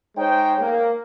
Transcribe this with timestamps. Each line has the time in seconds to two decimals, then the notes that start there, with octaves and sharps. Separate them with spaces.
0.16 G#3 D#4 C5 C#5 G5
0.60 A#3